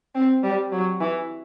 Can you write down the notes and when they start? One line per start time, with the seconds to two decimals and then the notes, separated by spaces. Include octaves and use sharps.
0.15 C4
0.43 G3
0.72 F#3
1.00 E3